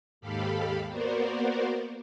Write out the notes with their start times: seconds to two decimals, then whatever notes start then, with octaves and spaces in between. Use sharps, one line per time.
0.21 D#2 G#2 G4 A4 F5 B5
0.89 A#3 B3 F#4 A#4 C5 D5